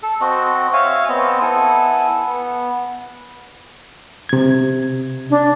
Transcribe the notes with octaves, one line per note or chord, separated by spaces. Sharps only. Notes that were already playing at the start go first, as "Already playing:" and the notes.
A4
C4 F#4 D#5
C#5 E5 F5 G#5
B3 C4 D#5
B3 E4 A4 G#5
B3
C3 G#6
D4